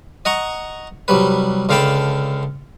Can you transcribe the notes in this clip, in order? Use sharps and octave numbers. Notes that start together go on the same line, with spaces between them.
D#5 F#5 A#5 C#6
C2 F#3 G3 B4
C#2 D3 F5 G5 A5 B5